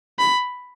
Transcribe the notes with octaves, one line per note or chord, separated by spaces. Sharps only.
B5